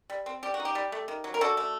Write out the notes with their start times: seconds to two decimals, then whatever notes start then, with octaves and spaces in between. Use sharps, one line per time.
0.10 G3
0.26 C4
0.43 G3 G4
0.54 F#4
0.60 D#4
0.65 G4
0.75 G3
0.92 A3
1.08 D#3
1.24 F#3
1.34 A#4
1.41 D4 F#4 A4
1.57 A3